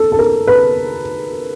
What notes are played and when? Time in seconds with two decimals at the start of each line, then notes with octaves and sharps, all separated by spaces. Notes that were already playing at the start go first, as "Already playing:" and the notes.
Already playing: A4
0.12 A4
0.19 A#4
0.47 B4